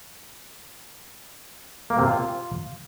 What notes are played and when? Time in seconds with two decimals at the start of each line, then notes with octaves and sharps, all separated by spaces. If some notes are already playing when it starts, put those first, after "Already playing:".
1.90 A#3
1.98 C3
2.06 F4